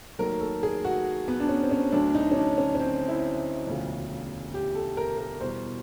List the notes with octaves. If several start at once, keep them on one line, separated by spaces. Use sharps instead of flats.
D#2 D#3 F#3 A3 A#4
A4
G#4
F#4
B3
D4
C#4
C4
C#4
D2 D3 F#3 D4
D#4
C#4
D4
C#4
C#4
C4
E4
E1 D2 C#3 F3
G4
A4
A#4
A#4
E2 B2 G3 C5